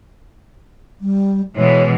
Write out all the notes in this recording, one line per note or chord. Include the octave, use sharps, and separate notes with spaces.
G3
B2 E3 G#3 C#5